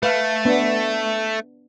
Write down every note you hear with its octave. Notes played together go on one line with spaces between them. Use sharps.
A3 B4 F5
B3 D4